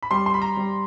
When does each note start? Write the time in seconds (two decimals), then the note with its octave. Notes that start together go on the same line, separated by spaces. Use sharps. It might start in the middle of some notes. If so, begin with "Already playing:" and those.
0.03 B5
0.11 G3 C6
0.26 C6
0.34 B5
0.42 A#5
0.57 G3